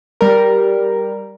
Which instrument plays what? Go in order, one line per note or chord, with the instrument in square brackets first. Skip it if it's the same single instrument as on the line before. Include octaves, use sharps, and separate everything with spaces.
[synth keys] G3 A#4